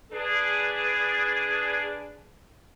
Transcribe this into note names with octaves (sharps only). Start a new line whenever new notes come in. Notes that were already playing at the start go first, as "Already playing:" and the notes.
D4 G#4 B4